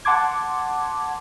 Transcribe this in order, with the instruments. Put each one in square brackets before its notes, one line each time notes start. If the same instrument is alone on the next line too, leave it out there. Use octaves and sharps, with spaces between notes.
[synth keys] F#5 A5 C6 D6 G#6